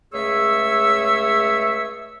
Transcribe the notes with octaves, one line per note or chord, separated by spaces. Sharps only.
C#2 A3 G#4 C#5 E5 E6